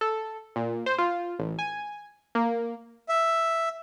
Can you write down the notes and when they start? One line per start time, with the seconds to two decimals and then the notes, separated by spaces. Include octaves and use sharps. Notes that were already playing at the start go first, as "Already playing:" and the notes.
0.01 A4
0.56 A#2
0.86 C5
0.98 F4
1.39 A1
1.59 G#5
2.35 A#3
3.09 E5